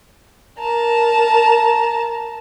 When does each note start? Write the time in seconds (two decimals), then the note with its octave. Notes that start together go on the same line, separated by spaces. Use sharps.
0.60 A#4 A5 A#5